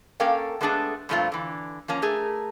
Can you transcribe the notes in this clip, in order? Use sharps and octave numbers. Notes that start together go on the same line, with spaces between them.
A#3 C#4 A4 A#4 F5 G5
G#3 A3 B3 D4 G#4 A4
G2 A#2 F3 A3 C4 F4
D3 E3
F3 A#3 C#4
A3 G#4 A#4